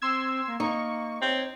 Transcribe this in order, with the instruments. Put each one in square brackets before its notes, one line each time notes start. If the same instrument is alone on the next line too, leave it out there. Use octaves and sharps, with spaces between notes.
[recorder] C4 [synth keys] C6 E6 G#6
[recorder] A#3
[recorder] A#3 [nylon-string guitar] D#4 [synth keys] C#6
[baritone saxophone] C4 [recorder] C#5